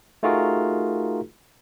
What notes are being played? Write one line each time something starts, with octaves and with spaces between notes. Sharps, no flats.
A3 D#4 F4 F#4 G#4 A#4